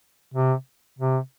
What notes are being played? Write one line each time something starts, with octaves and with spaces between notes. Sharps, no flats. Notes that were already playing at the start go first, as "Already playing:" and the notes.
C3
C3